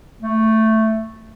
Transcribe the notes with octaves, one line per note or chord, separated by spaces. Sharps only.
A3